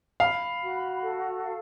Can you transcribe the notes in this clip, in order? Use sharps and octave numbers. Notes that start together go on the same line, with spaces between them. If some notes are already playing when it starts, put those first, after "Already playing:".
F5 B5
F#4
A4
F5